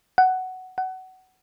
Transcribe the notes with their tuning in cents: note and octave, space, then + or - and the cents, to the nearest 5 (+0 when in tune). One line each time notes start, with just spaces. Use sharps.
F#5 +10
F#5 +20